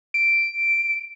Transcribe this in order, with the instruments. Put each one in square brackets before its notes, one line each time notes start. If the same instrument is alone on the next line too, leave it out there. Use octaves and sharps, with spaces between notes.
[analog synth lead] D7